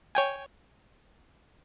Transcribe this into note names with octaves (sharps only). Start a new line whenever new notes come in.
C#5 G5 G#5